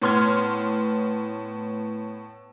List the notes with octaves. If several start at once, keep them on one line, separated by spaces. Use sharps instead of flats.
A2 B3 C6 F6 G#6